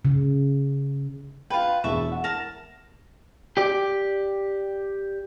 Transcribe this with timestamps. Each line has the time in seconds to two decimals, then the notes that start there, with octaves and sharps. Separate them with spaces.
0.05 C#3
1.50 F4 B4 G5
1.84 E1 E3 G#4 E5 A5 C#6
2.12 F#5
2.24 A#4 A5 A#5
3.57 G4 D5